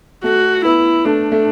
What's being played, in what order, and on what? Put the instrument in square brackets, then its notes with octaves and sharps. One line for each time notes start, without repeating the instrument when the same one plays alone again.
[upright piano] A3 [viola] F#4
[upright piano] B3 [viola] E4
[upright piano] A3 [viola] D4
[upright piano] A3